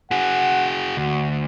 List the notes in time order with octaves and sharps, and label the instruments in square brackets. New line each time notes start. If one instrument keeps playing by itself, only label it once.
[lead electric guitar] F#4 G#4 [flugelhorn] F#5
[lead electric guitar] D2 [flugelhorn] F#4